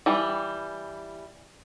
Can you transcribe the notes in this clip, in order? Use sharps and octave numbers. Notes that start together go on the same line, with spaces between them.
E3 G3